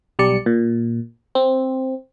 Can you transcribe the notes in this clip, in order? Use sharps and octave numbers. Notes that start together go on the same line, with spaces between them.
B1 G3 D5 C#7
A#2
C4